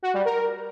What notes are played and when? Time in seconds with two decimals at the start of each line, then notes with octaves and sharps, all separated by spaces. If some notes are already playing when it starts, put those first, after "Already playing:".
0.03 F#4
0.14 G3
0.25 A#4